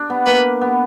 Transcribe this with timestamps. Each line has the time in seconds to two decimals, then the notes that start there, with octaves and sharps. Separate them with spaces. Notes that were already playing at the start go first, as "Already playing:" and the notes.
Already playing: D4
0.10 B3
0.26 A#3 B4
0.61 B3